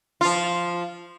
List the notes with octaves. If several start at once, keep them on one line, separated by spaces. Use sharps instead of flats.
F3 F4